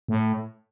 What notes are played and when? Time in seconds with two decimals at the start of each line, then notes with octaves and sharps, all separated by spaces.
0.08 A2